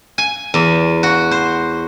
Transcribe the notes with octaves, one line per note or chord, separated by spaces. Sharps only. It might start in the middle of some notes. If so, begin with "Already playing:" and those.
G#5
E2
F#4
C5